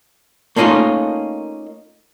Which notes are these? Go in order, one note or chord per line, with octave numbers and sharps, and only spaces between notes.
A3 A#3 C#4 D#4 F4